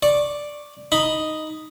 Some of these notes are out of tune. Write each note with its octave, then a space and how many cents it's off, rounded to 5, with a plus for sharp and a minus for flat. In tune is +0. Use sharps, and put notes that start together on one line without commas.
D5 +0 C#6 -20
D#4 +0 B5 +0